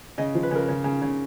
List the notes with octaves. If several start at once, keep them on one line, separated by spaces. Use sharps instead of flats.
C#3 D#5
F3
B4
C#3 A#4
C#3
C#3
C#3